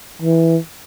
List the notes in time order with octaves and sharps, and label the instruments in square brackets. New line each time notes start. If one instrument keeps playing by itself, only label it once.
[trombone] E3